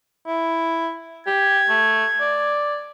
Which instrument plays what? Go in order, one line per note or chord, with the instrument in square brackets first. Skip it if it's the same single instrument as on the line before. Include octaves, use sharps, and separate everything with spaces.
[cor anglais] E4
[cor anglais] G4 [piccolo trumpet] G#6
[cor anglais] A3
D5